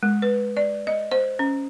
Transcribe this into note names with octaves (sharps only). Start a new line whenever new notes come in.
G#3
B4
D5
D#5
C5
C#4